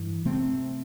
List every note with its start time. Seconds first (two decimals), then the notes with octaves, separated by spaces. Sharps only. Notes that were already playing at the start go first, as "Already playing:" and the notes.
Already playing: G2 E3
0.25 C3 A3 C4